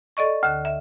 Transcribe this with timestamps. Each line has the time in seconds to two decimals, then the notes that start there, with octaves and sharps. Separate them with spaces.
0.17 A4 D5 D#5 C#6
0.43 D2 D3
0.65 E5